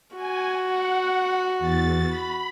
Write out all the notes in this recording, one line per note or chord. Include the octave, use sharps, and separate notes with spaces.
F#4 G#5
F#5
E2 A6
B5